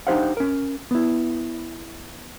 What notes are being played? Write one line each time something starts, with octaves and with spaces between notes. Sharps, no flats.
D4 D#4 G4 C5 F5 F#5
C#4 A#4
B3 E4